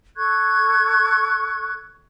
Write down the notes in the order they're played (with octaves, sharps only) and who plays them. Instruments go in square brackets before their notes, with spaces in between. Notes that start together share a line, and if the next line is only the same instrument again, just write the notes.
[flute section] A4 C#6 F#6 G#6